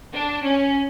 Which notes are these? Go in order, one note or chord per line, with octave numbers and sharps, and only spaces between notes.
D4
C#4